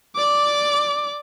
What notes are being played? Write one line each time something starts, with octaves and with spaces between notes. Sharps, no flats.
D5 D6